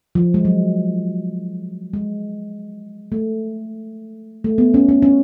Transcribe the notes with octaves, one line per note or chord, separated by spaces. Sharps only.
F3
G#3
F#3
G#3
A3
A3
B3
C#4
C#4
C#4